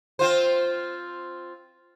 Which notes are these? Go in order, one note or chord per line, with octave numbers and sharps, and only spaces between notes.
C4 F4 C5